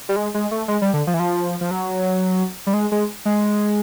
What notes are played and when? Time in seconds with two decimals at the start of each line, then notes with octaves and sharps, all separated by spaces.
0.09 G3
0.16 G#3
0.34 G#3
0.51 A3
0.68 G#3
0.82 G3
0.94 D3
1.07 F3
1.14 E3
1.20 F3
1.61 F3
1.71 F#3
2.67 G3
2.73 G#3
2.92 G#3
3.25 G#3